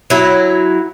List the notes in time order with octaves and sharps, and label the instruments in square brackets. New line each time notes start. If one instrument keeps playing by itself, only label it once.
[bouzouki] F#3 E4